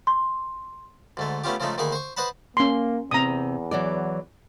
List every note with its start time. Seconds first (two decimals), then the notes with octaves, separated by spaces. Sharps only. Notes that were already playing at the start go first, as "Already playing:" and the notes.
0.07 C6
1.17 D2 G#2 A3
1.44 A3 B3 C#4 F4 G4
1.60 C#3 F3 G#3 A3 D#4
1.78 D2 D#3 A#3 D#4 G#4 B5
1.92 C5 C#6
2.17 B4 C5 D#5 F#5 A5 B5
2.57 A#3 C#4 C6
3.11 E2 C3 C4 A#5 D#6
3.71 E3 F#3 D5